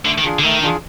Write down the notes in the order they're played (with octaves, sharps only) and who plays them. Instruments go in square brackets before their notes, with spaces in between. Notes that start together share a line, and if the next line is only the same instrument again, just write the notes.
[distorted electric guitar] D3 [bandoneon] A3
[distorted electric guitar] D#3
[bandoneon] D4 F4 G#4
[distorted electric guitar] D3
[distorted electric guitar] D#3 [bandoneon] A3
[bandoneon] D4 F4 G#4